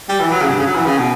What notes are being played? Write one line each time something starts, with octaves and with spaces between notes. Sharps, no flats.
G3
E3
F#3
C#3
G2
C#3
F#3
E3
C#3
B2